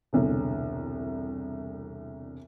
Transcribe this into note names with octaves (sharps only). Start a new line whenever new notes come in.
E1 C2 D3